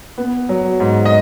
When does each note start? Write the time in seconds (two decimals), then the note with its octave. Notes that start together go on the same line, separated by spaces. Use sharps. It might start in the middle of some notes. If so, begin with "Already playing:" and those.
0.18 B3
0.49 F#3
0.80 G#2
1.05 D#5